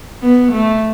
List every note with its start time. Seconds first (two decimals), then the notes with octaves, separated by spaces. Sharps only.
0.23 B3
0.53 A3